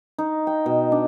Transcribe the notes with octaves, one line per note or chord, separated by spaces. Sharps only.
D#4
G5
B2
D4